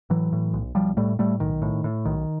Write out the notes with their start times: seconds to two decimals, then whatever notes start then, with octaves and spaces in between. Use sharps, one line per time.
0.10 A2 E3 F#3
0.32 A2
0.53 B1
0.75 B1 F3 G3
0.97 A2 G3 A3
1.19 A2 G3 A3
1.40 B1 D#3
1.62 A2
1.84 A2
2.05 B1 D#3